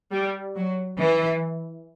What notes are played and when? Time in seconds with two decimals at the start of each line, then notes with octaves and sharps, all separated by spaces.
0.12 G3
0.56 F#3
0.99 E3